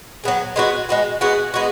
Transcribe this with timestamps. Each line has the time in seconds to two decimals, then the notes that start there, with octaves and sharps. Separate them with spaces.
0.24 F#3 B3 G#4
0.56 G#3 B3 F#4
0.89 G#3 B3 F#4
1.21 G#3 B3 F#4
1.54 G#3 B3 F#4